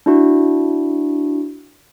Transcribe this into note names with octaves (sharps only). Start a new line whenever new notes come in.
D4 E4 F#4